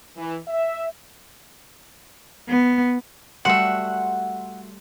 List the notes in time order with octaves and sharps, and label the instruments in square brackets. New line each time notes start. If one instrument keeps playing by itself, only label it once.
[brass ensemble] E3
E5
[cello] B3
[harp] G3 A3 C6 [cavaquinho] F#4 E5 [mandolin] F#5